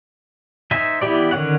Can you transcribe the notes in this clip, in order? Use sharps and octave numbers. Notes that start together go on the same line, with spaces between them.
D#4 C5 E5 G#5
E3 B3 E4 G4 D5
D3 D#3 C#4 C#5 F#5